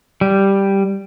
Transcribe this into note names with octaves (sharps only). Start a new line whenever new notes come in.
G3